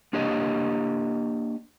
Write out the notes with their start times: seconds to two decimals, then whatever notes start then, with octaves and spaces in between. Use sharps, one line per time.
0.13 A#3 D4 G4 C#5 D#5